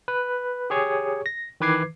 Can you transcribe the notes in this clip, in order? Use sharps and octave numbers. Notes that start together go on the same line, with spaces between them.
B4
G4 G#4 C#5 C#6
A#6
D#3 E3 B4 D6 G#6 C7